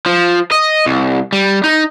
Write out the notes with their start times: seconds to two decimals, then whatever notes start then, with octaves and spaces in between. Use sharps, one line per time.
0.06 F3
0.52 D#5
0.86 C2
1.33 G3
1.64 D#4